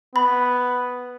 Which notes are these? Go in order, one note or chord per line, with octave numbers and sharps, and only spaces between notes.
B3 B5